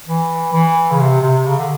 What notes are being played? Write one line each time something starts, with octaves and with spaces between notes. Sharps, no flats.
E3
E3
C#3
C3
C3
C#3
D3